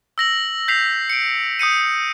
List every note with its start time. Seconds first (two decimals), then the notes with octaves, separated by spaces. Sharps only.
0.18 E6 A#6 F#7
0.68 G6 B6 C7 F7
1.10 C#7 D7
1.59 D#6 G6 C#7 D#7